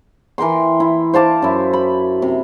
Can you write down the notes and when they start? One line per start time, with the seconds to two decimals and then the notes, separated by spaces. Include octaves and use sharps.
0.38 E3 A#4 G5 C6
0.80 E4
1.14 C5 F5 A5 D6
1.42 F#2 E4
1.73 B5
2.22 C3